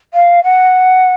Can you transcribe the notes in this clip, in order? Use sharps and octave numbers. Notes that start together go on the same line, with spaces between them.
F5
F#5